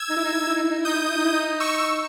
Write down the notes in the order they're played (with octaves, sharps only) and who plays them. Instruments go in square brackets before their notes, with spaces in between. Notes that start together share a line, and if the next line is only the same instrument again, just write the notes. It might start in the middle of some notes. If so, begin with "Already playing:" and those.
Already playing: [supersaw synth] E6 G#6
[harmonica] D#4
E4
D#4
E4
D#4
E4
D#4
E4
D#4
E4
[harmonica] D#4 [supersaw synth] D#6 G6
[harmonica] E4
D#4
E4
D#4
E4
D#4
[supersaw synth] C#6 E6